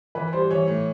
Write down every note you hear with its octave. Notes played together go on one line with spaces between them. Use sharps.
E3 B4
G3 C5
E3 C#5
A2